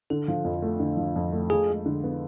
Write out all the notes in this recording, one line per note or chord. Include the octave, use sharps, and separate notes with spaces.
D3 A4
F3
F2
A3
D3
F3
F2
A3
F3 G#4
G#3
D3
B3